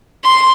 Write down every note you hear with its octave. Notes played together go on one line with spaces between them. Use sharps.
C6